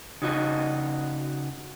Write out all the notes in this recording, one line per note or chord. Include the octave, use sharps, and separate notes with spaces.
C#3 D#4 F#4 D#5